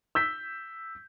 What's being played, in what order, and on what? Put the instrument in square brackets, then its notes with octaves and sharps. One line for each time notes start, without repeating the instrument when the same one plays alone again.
[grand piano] E6 G6 B6